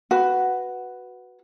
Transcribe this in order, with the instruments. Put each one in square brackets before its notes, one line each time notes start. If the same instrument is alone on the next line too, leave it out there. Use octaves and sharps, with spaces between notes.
[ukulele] F#4 B4